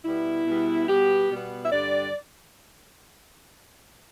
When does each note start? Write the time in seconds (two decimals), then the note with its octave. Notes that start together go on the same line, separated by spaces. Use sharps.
0.05 B2 G3 B3 E4
0.46 B2 G3 B3
0.88 B2 G3 B3 G4
1.30 B2 G3 B3
1.65 E5
1.71 G2 D3 G3 D5